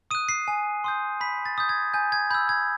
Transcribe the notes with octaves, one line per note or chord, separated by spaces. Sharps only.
D#6 F#6 D#7
C7
G#5
C6 D#6 G6
B5 B6
A6
D#6 G6
G#6
G#5 G6
G#6
B5 E6 G6
G#6